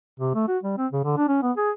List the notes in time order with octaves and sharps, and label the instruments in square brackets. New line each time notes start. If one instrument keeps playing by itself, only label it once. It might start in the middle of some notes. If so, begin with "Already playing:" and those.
[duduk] C3
A3
F#4
G3
C4
C#3
D3
D4
C#4
B3
G#4